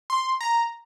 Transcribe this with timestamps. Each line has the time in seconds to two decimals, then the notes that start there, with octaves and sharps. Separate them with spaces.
0.10 C6
0.41 A#5